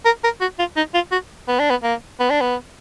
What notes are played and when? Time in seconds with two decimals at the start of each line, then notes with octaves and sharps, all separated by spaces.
0.06 A#4
0.24 A#4
0.41 F#4
0.59 F4
0.77 D#4
0.94 F4
1.12 F#4
1.48 B3
1.60 D4
1.71 B3
1.83 A#3
2.20 B3
2.31 D4
2.41 B3